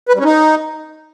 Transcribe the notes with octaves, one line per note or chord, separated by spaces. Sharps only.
B4
G3
C#4
D#4